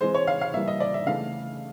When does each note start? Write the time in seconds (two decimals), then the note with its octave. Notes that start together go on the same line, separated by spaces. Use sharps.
0.01 E3 G#3 C4 C5
0.15 C#5
0.27 F5
0.41 F5
0.54 E3 G3 A#3 E5
0.68 D#5
0.80 D5
0.94 E5
1.06 C#3 E3 A3 F5